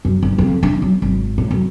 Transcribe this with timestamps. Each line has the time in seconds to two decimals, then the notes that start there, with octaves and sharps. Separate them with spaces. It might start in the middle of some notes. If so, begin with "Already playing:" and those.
0.05 F#2
0.23 G1
0.38 F2
0.63 D4
0.82 F#3
1.02 G#1
1.38 A2
1.51 F#2